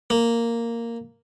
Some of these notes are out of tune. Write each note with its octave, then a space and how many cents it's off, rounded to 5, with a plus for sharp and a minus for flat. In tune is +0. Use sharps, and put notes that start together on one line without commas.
A#3 -5